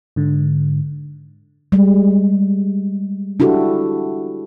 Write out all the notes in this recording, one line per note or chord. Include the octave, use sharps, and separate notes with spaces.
G#2 D3
G3 G#3
D4 E4 F#4 G4 A4